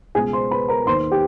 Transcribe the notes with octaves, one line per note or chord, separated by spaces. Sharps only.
C#2 B2 G#4 G#5
C5 C6
B4 B5
A#4 A#5
D#2 D#3 C5 C6
G4 G5